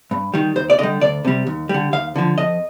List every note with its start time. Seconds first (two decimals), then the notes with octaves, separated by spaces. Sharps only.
0.11 G2
0.34 D#3 G3
0.56 D#2 C5
0.70 D5
0.79 D3 G3 D#5
1.01 D2 D5
1.25 C3 G3
1.47 D#2
1.69 D3 G3
1.93 D#2 F5
2.16 D3 F3
2.38 F2 D#5